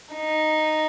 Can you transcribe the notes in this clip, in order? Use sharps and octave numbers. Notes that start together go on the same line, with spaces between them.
D#4